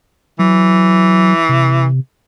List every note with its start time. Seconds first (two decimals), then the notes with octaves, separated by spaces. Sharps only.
0.39 E3 F#3
1.49 C3